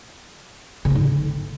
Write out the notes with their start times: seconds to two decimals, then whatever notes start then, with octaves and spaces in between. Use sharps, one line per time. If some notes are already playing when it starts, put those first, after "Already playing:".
0.85 C#3
0.90 B3
0.95 G#2
1.00 D3